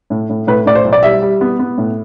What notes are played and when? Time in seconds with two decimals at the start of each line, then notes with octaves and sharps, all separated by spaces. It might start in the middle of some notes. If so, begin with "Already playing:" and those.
0.10 A2
0.29 A2
0.47 A2 B4
0.65 A2 D5
0.75 C5
0.84 B1
0.93 D5
1.03 G3 E5
1.22 G3
1.41 B3
1.59 B3
1.78 A2